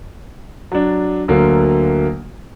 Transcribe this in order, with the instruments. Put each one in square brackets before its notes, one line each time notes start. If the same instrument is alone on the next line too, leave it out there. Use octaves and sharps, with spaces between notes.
[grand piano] F#3 D4
D2 D3 F#3 A#3